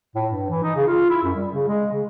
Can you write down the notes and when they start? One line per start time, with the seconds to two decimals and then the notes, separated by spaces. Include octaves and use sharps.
0.15 A2
0.30 G2
0.50 E3
0.63 D#4
0.76 C#3
0.87 F4
1.10 E4
1.23 F#2
1.36 G3
1.53 C#3
1.68 G#3
1.92 C#3